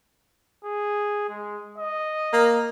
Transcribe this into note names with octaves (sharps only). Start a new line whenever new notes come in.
G#4
G#3
D#5
A#3